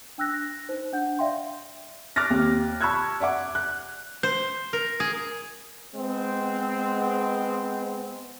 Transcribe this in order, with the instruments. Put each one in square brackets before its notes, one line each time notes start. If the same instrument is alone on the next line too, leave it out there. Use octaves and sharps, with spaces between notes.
[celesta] D4 G5 E6 F#6 A#6
A#6
D#4 C5
D4 F#5 G6
D5 E5 F5 G5 C6
[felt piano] D6 F6 F#6 A6 A#6
D#2
A5 B5 C#6 E6 F#6 G#6
D5 E5 F#5 D6
F#6
[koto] C5
A#4
G#4
[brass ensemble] G#3 B3 C4